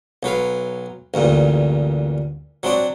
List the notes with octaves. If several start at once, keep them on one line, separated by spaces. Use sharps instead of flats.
B1 F#3 B4 F5
A1 D2 G2 A#2
F#3 C4 D4 F#4 D5